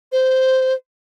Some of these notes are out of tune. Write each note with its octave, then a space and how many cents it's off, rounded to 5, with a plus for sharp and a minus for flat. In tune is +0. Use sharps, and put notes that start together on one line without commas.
C5 -10